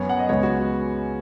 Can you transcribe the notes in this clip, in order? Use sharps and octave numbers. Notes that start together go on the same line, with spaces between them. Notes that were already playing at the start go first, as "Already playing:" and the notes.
Already playing: F#2 F#3 B3 C#5
F#5
D#5
C#2 C#3 G#3 B3 C#5
F#4